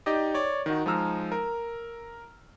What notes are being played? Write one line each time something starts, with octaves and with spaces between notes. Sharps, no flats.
D#4 G4 D5 D#5
C#5 D5
D#3 D#4 F#4
F3 G#3 D#4 A#5 E6 F6
A#4